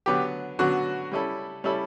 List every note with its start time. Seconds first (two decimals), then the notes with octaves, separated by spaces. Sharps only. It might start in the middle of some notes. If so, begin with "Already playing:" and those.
0.06 D3 F#3 B3 G4
0.59 D3 F#3 B3 F#4
1.11 G3 C#4 E4 A4
1.64 G3 C#4 E4 A4